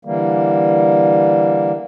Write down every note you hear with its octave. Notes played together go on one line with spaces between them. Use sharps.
D3 E3 G3 A#3